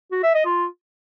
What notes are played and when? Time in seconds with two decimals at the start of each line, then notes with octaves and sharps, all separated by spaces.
0.12 F#4
0.23 E5
0.34 D#5
0.46 F4